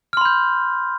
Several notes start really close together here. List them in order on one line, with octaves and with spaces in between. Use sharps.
F6 C6 B5 G6